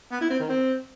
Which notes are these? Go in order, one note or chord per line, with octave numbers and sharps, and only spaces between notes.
B3
E4
C4
D#3
C4